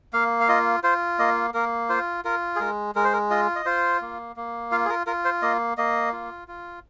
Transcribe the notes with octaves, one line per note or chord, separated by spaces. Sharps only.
A#3 F5
F5
F4 D#5
F4 C5
A#3 D#5
A#3 A#4
F4 C5
F4 A#4
G#4
G#3 A#4
G#3 A#4
C5
A#4
F4 D#5
D#5
F4 C5
A#3
A#3
F4 F5
G#4
A#4
F4 A#4
C5
A#3 D#5
A#3 D#5
F4
F4